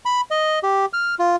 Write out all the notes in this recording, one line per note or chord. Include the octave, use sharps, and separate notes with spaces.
B5
D#5
G4
F6
F4